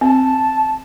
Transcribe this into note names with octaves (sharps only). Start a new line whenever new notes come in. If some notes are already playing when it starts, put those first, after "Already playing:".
C4 A5